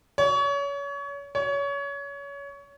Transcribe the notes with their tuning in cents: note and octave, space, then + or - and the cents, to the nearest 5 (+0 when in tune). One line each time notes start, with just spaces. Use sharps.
C#5 +30
C#5 +25